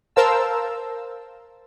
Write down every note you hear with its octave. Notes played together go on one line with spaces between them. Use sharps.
A#4 C5 F5 A5 E6